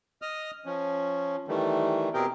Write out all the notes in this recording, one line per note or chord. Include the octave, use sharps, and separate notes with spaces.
D#5 D#6 F6
F3 C#4
D#3 E3 G3 A3
B2 C4 G4 G#4 A#4 G5